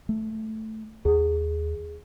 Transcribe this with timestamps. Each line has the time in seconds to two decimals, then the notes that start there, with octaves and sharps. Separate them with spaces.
0.09 A3
1.05 D#2 G#4